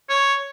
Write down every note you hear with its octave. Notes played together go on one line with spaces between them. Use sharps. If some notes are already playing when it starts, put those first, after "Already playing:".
C#5